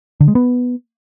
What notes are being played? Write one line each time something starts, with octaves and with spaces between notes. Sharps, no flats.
D3
G#3
B3